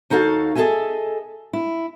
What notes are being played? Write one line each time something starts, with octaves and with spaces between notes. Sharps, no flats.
D#2 D#4 F#4 A4 F5
G#4 A4 C#5 D#5 E5 G#5
E4